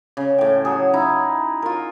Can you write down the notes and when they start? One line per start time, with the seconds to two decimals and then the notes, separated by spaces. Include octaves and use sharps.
0.17 C#3
0.38 A2 G5
0.65 F#3 G#4
0.94 D#4 E4
1.62 F4 A#4